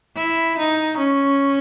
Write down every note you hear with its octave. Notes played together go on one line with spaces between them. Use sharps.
E4
D#4
C#4